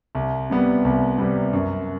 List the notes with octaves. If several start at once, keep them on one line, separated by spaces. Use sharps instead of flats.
C2
C3 G3 B3
C2
C3 G3 B3
F#2